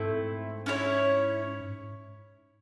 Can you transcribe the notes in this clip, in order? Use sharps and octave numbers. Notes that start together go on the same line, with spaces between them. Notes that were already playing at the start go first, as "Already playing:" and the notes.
Already playing: G#2 A3 C4 E4
C#4 E4 A4 C#5